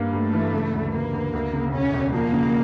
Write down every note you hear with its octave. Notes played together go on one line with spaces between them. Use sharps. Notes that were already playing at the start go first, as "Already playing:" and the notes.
Already playing: G2 A#3
G2 A3
E3
C#3
D2
D2 A#3
D2
D2
C#3
E1 C#4
E1
F3 A#3
C#3